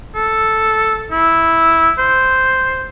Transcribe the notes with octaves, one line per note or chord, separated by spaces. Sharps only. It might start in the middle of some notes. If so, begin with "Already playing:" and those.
A4
E4
C5